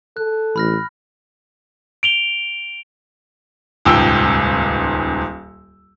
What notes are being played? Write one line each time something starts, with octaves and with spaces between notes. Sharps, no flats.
A4 F#6
A1 B5 F6 A#6
D7 F7 G7
D#1 C#2 G#2 G5 E6